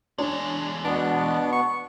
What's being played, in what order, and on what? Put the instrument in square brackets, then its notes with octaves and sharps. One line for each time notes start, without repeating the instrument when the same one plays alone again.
[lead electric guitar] E2 G#3 [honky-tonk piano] D4 C#5
[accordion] B2 B3 [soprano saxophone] D4 [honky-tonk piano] B4 F#5
[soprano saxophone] C#6